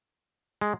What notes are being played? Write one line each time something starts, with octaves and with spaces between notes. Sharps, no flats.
G#3